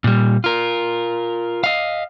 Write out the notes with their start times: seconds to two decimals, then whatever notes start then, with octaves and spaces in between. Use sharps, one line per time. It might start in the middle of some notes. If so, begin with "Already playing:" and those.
0.04 A#2 G3
0.44 F4 A#4
1.64 D#5 F5